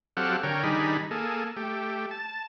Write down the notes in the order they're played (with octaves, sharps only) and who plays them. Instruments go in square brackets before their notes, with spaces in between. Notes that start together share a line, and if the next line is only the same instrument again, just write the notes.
[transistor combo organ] F#3 C4 G4 A4 F5 F#5
D3 A#4 C#5 G5
D#3 G3 D4 D#4 G#4 B5
A#3 G#4 A4
A3 G4
A5